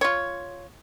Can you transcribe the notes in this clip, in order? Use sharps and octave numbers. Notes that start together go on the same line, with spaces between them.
F4 C#5